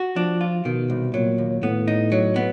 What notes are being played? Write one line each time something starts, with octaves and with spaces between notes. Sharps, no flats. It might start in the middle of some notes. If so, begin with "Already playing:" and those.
Already playing: F#4
F3 D4
F4
B2 D#3
C2
A#2 F#3
D#2
A2 B3
D#4
F#3
B3